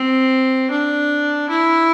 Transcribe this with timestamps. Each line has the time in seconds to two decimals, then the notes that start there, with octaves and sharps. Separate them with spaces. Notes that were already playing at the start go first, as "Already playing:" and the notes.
Already playing: C4
0.71 D4
1.49 E4